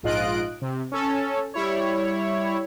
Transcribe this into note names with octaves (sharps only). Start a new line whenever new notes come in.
A#1 G#2 F4 D#5 F#6 D7
C3
C#4 A4
G3 E4 C#5